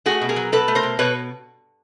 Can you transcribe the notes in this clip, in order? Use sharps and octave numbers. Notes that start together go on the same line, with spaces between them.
A3 F#4 G#4
B2
G#4 A#4
F#3
B2 A4 B4
A3
A#4 C5
B2
B2 B4 C#5